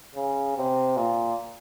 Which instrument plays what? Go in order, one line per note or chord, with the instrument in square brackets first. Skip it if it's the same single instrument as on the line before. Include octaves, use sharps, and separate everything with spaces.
[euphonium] C#3
C3
A#2